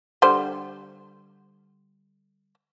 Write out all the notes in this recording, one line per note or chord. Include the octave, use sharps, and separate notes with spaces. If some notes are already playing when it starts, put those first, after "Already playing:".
D3 G3 C5